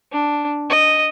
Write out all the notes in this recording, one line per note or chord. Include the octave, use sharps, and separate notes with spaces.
D4
D#5